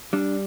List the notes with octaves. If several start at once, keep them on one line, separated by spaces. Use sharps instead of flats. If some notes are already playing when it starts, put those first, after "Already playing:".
G3 D4